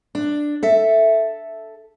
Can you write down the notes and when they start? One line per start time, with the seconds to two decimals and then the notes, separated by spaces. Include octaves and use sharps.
0.15 D4
0.63 A4 E5